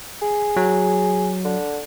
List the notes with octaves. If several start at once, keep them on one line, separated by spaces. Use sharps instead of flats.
G#4
F#3
D3